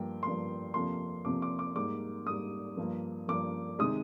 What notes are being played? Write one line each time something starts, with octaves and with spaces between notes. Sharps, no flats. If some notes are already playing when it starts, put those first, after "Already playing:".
Already playing: G2 F3 A#3 G5
G2 F3 A#3 C6
F2 C3 F3 A#3 C6
F2 C3 F3 A#3 D6
D6
D6
G#2 G3 A#3 D6
G#2 G3 A#3 D#6
G2 F3 A#3
G2 F3 A#3 D6
C3 D#3 G#3 D#6